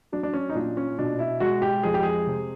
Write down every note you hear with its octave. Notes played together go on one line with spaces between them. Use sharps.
F#3 D4
D4
C#4
D#4
A#2 D4
C#4
B2 D4
E4
G#3 F#4
G4
F2 G#4
G4
G#4
C3